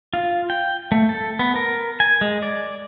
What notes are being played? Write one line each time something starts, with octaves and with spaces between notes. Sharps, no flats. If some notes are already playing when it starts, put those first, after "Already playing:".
F4
G5
A3
A4
B3
A#4
G#5
G#3
D5